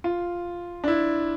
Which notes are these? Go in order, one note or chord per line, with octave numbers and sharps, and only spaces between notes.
F4
D4
E4